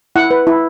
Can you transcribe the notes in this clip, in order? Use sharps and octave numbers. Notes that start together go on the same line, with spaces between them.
E4 F#5
B4
E4